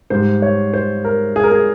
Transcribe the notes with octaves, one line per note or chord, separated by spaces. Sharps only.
G#2 G3 C5
C#5
C5
A#4
G#4
A#4
G#4